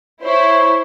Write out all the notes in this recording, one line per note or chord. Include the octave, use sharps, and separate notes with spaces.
E4 C5 C#5